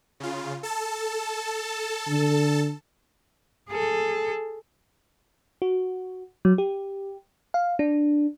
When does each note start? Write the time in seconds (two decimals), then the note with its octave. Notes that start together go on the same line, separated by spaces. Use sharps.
0.20 C#3 F4
0.63 A4 A5
2.08 D3
3.70 G#4 A4
5.62 F#4
6.45 F#3
6.58 G4
7.54 F5
7.79 D4